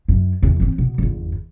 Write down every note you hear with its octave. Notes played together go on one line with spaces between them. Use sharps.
F#2 D4
E2 D#3
E3 C4
B2
G1 E2